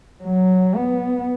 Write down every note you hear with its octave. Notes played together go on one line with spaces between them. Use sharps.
F#3
B3